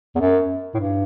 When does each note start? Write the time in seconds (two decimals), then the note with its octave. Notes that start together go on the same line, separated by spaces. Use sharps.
0.15 E2
0.20 F#2
0.74 A2
0.79 G2